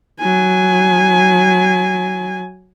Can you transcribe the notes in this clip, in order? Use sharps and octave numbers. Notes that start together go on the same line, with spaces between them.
F#3 G#5